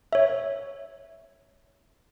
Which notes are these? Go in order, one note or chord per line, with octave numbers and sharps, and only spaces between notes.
C#5 E5